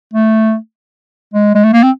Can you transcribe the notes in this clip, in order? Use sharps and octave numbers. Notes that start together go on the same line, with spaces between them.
A3
G#3
G#3
A3
A#3
C4